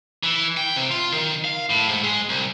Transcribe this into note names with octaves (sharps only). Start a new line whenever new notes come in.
E3
G5
C3
F4
D#3
F5
A2
G#2
G#3
C2